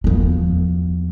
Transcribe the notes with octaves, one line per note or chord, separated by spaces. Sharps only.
E2 F3